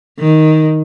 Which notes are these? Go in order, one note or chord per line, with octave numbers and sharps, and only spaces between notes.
D#3